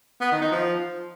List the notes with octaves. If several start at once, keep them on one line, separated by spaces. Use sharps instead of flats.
B3
D#3
D#4
F3